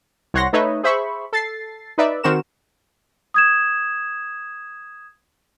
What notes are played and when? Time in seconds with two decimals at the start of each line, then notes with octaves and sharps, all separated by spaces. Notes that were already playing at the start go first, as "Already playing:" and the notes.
0.34 C2 C#5 F#5 C6 A#6
0.53 A3 D#4 B4 C#5 D#5 E5
0.83 G#4 C5 E5 B5 C#6
1.33 A4 A6 C7
1.98 D#4 B4 D5 E5
2.23 D#3 C4 F#4 A#4 E7
3.34 D#6 G#6 E7